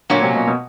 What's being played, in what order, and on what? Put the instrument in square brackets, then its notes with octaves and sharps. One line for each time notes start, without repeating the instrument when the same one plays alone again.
[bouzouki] A#2 F#3 A#3 C#4 [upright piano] D3
[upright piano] C3
B2
B2